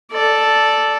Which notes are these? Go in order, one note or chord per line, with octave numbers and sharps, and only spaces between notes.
A4 D5